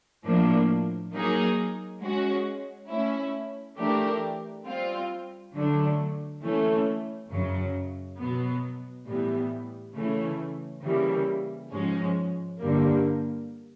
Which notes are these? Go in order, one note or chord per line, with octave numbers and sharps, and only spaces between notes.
A2 F3 A#3 D4
F#3 A#3 D#4 G#4
G#3 C#4 F#4
A3 C#4 E4
E3 A3 D4 G4 A#4
G3 C4 F4
D3 F#3 A3 D4
E3 A3 C#4
F#2 C#3 F#3
B2 F#3 B3
A2 E3 G3 B3
C#3 E3 A3 C#4
C#3 E3 G3 A#3
G#2 F3 G#3 C#4
G2 D3 G3 A#3